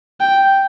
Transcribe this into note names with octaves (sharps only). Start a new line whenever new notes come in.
G5